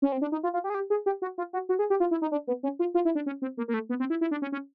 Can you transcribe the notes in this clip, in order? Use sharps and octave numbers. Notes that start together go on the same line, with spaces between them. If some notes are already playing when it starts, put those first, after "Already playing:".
C#4
C4
D4
D#4
F4
F4
G4
G#4
G4
G#4
G4
F#4
F4
F#4
F#4
G#4
G4
F4
E4
D#4
D4
B3
C#4
F4
F4
E4
D4
C#4
C4
A#3
A#3
A3
B3
C4
E4
E4
D4
C#4
C#4